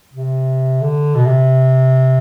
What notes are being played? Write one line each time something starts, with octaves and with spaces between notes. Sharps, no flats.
C3
D3
B2
C3